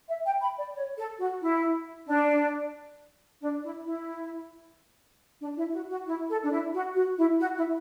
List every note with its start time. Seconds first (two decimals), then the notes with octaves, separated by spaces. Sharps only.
0.09 E5
0.25 G5
0.42 B5
0.59 D5
0.75 C#5
0.97 A4
1.20 F#4
1.42 E4
2.08 D4
3.41 D4
3.63 E4
3.86 E4
5.41 D4
5.57 E4
5.74 F#4
5.90 F#4
6.07 E4
6.29 A4
6.44 D4
6.52 E4
6.74 F#4
6.95 F#4
7.18 E4
7.40 F#4
7.56 E4